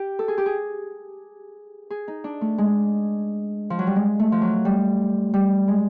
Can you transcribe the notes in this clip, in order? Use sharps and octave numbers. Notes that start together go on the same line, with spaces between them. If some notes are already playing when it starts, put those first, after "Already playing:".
Already playing: G4
A4
G#4
G4
G#4
G#4
D#4
D4
A3
G#3
F3
F#3
G3
G#3
A3
F3
F#3
G3
G3
G#3